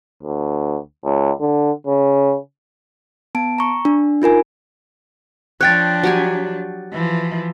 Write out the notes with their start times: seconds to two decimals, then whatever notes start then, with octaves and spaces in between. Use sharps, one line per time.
0.23 D2
1.05 C#2
1.40 D3
1.87 C#3
3.35 B3 A5 D7
3.58 A#5 C#6
3.85 D4
4.22 D#4 F4 A#4 G#5
5.61 F3 D4 C#5 G5 F#6 A6
6.03 F#3 G4 G#5
6.92 E3 F3